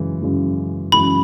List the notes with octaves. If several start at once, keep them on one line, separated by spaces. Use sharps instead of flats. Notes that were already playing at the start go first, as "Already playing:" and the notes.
Already playing: F#2 C#3 E3 G#3
F#2 C#3 E3 G#3
F#2 C#3 E3 G#3 B5